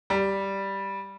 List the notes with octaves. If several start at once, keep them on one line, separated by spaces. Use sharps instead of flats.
G3